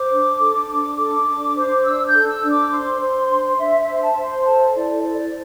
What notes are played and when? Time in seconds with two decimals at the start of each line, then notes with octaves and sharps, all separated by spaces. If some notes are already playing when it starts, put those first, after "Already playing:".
Already playing: C5 D6
0.11 D4
0.39 A4
0.68 D4
0.97 A4 D6
1.26 D4
1.55 C5
1.84 D4 E6
2.06 G6
2.13 A4
2.28 E6
2.42 D4
2.50 D6
2.71 C5 C6
3.00 C5
3.30 D4
3.58 D4 E5
3.80 E5
3.87 C5
3.95 C6
4.01 A5
4.16 C5
4.23 C6
4.45 A4 A5
4.74 E4 D5
5.03 C5 D5